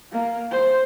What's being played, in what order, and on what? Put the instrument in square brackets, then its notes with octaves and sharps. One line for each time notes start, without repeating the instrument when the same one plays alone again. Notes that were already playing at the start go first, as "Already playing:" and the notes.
[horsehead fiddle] A#3
C5